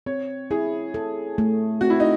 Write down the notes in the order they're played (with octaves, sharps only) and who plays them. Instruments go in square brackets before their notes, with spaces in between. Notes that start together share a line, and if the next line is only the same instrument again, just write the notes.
[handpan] C4 [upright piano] C#5
[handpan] E4 [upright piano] G#4
[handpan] A4
A3
[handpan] C4 [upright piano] F#4
[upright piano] E4
D#4